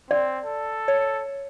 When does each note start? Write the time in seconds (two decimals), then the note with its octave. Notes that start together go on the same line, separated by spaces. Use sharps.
0.11 C4 D5
0.45 A4
0.88 C#5